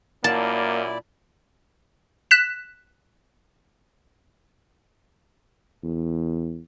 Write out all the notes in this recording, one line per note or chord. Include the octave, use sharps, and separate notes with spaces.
F#2 A#2 A#3 E4 D5 A5
F#6 B6 E7
E2